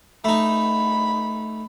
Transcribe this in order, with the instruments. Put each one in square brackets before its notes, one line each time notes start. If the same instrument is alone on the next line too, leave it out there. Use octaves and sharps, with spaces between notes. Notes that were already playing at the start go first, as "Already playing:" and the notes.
[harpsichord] A3 D#4 [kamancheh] B5